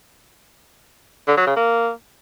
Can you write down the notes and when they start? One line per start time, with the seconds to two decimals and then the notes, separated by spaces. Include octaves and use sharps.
1.28 D3
1.37 F#3
1.47 C#3
1.56 A#3